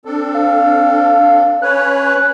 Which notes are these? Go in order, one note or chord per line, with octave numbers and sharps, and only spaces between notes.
C4 D4 A4
F5
C#4 B4 C#5 F#6